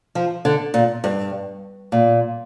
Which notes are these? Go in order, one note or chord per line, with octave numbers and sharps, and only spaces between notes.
F3
D3
A#2
G2
A#2